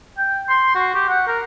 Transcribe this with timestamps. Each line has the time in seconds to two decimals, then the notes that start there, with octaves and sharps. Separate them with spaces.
0.18 G5
0.49 C6
0.75 F#4
0.94 G4
1.09 F#5
1.27 A#4